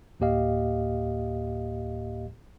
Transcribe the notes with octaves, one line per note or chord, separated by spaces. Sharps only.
D2 A2 A#3 G4 D#5 F5